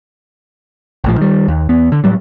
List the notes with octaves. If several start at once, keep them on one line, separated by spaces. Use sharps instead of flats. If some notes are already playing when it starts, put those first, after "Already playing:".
A#1 A2 F3
D#3 G3
D#2
E2 B3
D3
A2 F#3 G3